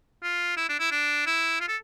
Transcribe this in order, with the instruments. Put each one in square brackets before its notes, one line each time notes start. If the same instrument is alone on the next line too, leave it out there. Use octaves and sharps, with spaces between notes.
[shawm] F4
E4
D4
E4
D4
E4
F4
A4